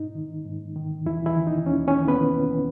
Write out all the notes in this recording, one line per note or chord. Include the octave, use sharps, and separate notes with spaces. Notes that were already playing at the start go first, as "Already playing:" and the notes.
Already playing: G#2 D#4
D#3
G#2
D#3
D#2 E3 E4
E3 E4
D#3
D#4
D#2 C#4
C#4
D#3
B3 B4